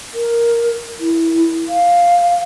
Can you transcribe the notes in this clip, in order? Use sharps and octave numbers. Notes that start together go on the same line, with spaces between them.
A#4
E4
F5